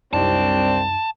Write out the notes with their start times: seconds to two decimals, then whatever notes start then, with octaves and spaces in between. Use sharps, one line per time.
0.13 C2 F#2 C4 D4 D#4 A5